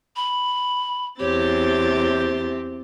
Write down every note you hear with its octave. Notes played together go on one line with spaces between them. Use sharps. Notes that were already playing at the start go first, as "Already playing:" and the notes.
B5
E2 C4 G4 C5 C#5 A6